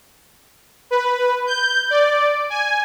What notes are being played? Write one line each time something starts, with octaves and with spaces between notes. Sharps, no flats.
B4
G6
D5
G#5